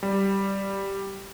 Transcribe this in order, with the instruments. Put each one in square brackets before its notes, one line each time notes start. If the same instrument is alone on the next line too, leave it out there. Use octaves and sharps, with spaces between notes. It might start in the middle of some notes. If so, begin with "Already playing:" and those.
[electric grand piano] G3